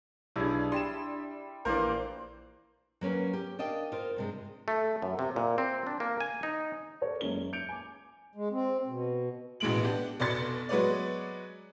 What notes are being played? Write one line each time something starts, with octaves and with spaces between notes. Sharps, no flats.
B1 G3 D4 E4 G#4
G3 C6 E7
A#1 E3 A#3 A#4 C5 D5
F#3 A#3 C#4 B4
G4
D4 A#4 D#5 F5 G5
F4 A#4 C5
G2 C3 G#3
A3
F#2
C3
A#2
C4
D4
A#3
G#5
D#4
A4 A#4 C#5 D5
F#1 G#3 C#4 G7
G6 C#7 D7 F7
G#5 D6
G#3
C4
B2
A1 B2 E3 G#3 D7 F#7
B3 D4 G4
F1 B2 D5 C6 A6 C#7
F#3 G#3 B3 B4 C#5 D5